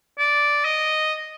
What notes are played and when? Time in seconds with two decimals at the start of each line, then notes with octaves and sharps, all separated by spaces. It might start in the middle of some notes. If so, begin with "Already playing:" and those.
0.19 D5
0.65 D#5